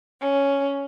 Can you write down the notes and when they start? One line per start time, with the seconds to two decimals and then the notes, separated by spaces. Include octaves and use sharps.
0.21 C#4